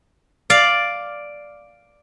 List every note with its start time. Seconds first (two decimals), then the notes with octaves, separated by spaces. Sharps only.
0.50 D5 F5